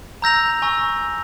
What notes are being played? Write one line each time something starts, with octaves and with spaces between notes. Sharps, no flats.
A#5 E6 G6 A#6 F7
G#5 C#6 E6